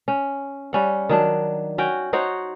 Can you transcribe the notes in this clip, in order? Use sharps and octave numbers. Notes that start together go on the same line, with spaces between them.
C#4
G3 C#4 F#5
D#3 F#3 D4
C#4 F#4 G5
D#4 F#4 C5 C#5